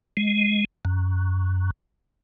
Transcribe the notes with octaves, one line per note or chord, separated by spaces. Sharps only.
G#3
F#2